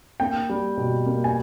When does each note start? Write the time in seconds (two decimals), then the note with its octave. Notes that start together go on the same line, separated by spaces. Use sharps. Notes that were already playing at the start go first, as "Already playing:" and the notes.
0.20 A#3 G5
0.49 G3
0.77 B2
1.06 A#3
1.24 G#5